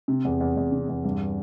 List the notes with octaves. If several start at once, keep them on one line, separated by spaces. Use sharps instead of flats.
C3
E2
E2
E2
C3
E2
G2